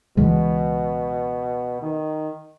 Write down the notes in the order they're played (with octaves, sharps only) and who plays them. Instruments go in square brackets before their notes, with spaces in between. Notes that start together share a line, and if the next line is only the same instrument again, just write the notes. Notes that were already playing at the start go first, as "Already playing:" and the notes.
[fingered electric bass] C#2 E3 G#3 [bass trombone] B2
[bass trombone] D#3